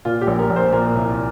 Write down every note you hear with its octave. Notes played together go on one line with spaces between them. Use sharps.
A#2 F4
G4
A#1
A#4
A#1
C5
A#2 A#4
C2